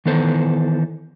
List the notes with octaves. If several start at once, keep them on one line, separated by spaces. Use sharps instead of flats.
D#3 E3 B3 A4 C5